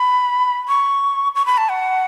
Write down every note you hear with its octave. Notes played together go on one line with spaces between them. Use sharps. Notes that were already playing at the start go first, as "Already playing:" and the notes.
Already playing: B5
C#6
C#6
B5
A5
F#5